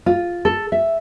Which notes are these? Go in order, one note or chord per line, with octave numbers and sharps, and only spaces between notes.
F4
A4
E5